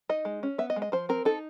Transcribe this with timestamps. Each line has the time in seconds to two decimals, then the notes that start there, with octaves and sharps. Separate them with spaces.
0.09 D#4 D#5
0.25 G#3
0.43 C#4
0.58 B3 E5
0.70 D#5
0.76 G#3
0.82 D#5
0.92 F3 C5
1.09 C4 A#4
1.25 D#4 A4